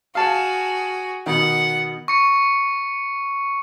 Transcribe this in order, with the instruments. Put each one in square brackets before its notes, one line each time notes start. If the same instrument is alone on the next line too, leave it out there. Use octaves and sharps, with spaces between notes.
[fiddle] F#4 G#4 [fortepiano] F5 A5
[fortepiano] B2 D#3 [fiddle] F#5
[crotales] C#6 C#7